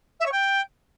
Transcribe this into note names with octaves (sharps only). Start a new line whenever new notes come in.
E5
C#5
G5